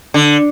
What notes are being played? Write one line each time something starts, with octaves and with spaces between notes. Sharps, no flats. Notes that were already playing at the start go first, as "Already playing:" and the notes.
D3